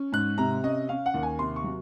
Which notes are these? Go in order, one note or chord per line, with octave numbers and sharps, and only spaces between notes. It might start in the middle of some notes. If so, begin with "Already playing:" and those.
Already playing: C#4
G#2 F#6
C3 A#5
C#4 D#5
C#4 F5
F#5
D#2
G#5
C3 C6
C#6
F#3